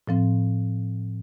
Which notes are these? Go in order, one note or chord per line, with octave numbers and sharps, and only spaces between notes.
A2 F3 C4